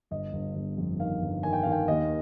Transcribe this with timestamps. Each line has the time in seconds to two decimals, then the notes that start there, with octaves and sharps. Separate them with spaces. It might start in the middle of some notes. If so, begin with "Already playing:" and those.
0.11 G1 D#5
0.33 G1
0.55 G1
0.78 F2
0.99 D#3 F5
1.22 G1
1.43 D#3 G#5
1.53 G5
1.63 D#3 F5
1.72 G5
1.88 D#2 D#5